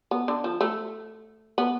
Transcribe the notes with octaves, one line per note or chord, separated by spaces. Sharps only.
B3
D3
F3
A3
B3